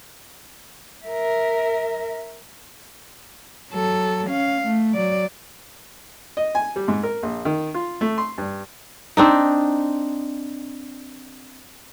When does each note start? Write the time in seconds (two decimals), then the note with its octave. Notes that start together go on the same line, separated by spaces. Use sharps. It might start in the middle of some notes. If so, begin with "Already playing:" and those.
1.05 A#4 E5
3.71 F#3 A4
4.28 C#4 F5
4.63 A3
4.94 F#3 D5
6.37 D#5
6.55 G#5
6.76 G3
6.88 G#2
7.03 A#4
7.23 A#1
7.45 D#3
7.74 F4
8.01 A3
8.18 C6
8.38 G2
9.17 C4 D4 D#4